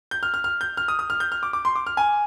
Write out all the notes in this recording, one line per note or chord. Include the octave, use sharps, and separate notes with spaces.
G6
F6
F6
F6
G6
F6
D#6
D#6
F6
G6
F6
D6
D6
C6
D6
F6
G#5